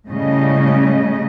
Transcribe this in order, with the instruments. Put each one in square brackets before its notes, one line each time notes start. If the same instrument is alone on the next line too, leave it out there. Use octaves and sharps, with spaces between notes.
[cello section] A2 C#3 G3 D#5